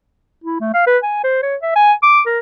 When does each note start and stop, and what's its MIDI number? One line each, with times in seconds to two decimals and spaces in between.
0.44 0.60 64
0.61 0.71 57
0.74 0.85 77
0.87 0.98 71
1.03 1.22 80
1.24 1.42 72
1.43 1.56 73
1.62 1.73 76
1.76 1.93 80
2.03 2.21 86
2.27 2.39 70